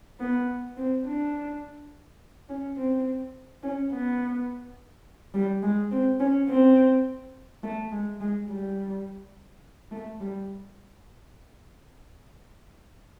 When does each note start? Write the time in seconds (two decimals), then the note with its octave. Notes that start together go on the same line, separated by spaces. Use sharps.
0.20 B3
0.77 C4
1.05 D4
2.49 C#4
2.77 C4
3.63 C#4
3.92 B3
5.34 G3
5.63 G#3
5.91 C4
6.20 C#4
6.49 C4
7.63 A3
7.91 G#3
8.21 G#3
8.49 G3
9.92 A3
10.20 G3